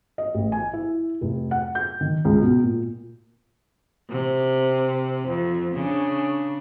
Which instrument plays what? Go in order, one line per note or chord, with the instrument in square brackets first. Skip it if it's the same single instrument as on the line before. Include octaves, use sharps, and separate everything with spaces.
[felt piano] D#5
A1
G#5
E4
F1
F#5
G6
D#3
C#2
B2
A#2
[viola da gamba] C3
F2
C#3 D4